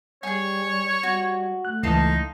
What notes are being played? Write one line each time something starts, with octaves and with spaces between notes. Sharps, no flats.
G3 G#4 C#5 G#5
G3 F#4
A3 F#6
C#2 E3 D#4 F5 A5 C6 D#6